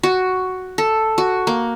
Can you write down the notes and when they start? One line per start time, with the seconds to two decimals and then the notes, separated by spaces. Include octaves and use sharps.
0.03 F#4
0.78 A4
1.18 F#4
1.47 A#3